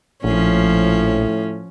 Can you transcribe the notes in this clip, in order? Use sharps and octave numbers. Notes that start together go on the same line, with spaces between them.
A#1 A2 F3 C#4